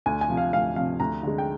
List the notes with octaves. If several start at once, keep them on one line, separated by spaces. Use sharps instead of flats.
D2 G#5
G#5
C3 F3
F5
D2 F5
C3 F3 F5
D2 A#5
D3 G#3
G5